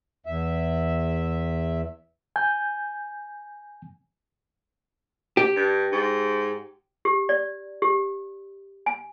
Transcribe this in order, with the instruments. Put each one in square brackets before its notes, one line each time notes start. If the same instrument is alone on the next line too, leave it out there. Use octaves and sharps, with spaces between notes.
[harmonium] E2 E5
[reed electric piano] G#5 G6
[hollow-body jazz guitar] G4
[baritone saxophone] G2
G#2
[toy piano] G4
D5
G4
G#5